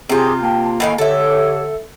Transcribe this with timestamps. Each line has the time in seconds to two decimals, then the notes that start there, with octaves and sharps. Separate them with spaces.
0.09 C3 C4 F4 G4 G#4
0.42 A#3 G5 A5
0.80 A2 D#3 F5 G#5 B5
0.98 D3 G4 A4 C#5 E5